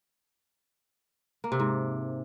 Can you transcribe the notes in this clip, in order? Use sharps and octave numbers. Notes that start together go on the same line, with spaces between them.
A#3
C3
G#2